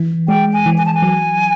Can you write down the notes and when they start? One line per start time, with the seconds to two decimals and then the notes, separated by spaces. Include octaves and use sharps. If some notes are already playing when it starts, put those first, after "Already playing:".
Already playing: E3
0.28 G#3 G5
0.53 G#5
0.66 E3
0.78 G#5
0.86 A5
0.94 G#5
1.02 F#3